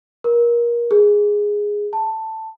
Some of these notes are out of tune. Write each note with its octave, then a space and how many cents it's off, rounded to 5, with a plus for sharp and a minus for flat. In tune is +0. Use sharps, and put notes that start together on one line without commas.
A#4 +25
G#4 -5
A5 +10